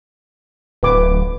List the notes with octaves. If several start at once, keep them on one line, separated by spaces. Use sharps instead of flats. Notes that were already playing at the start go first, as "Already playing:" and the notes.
D1 B4 D6